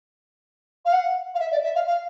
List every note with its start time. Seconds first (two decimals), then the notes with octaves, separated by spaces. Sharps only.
0.85 F5
0.92 F#5
1.34 F5
1.39 E5
1.52 D5
1.63 E5
1.75 F5
1.87 F5